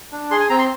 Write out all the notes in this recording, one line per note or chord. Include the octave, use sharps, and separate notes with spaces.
D4
G#4 C6
G#5
C4 A#5
C6